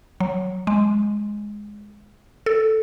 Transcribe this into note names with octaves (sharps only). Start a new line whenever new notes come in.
F#3
G#3
A4